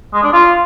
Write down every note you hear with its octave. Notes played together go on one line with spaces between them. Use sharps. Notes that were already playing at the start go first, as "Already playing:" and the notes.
G#3
D4
F4